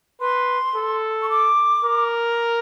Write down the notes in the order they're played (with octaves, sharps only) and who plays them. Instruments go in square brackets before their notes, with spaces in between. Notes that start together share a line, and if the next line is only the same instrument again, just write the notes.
[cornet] B4 [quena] C6
[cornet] A4
[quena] C#6
D6
[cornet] A#4